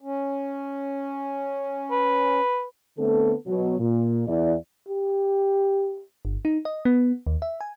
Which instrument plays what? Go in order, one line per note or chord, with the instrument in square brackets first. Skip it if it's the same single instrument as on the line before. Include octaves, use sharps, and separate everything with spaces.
[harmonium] C#4
[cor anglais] B4
[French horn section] D3 A3 B3 C4 A4
B2 F#3
A#2
E2 E4 D5
[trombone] G4
[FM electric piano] G1
D#4
D#5
B3
D#2
E5
G#5